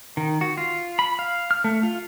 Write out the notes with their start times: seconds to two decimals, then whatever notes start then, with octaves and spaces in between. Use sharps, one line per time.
0.17 D#3
0.41 F#4
0.58 F4
0.99 B5
1.19 F5
1.51 F6
1.64 A3
1.83 F4